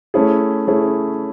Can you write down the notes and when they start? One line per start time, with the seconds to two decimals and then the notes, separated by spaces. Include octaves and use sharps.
0.14 A3 C#4 E4 G#4
0.67 A3 C#4 E4 G#4